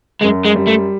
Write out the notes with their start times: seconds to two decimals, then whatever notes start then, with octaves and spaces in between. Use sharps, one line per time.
0.22 F#2 G#3
0.46 G#3
0.56 G3
0.67 A3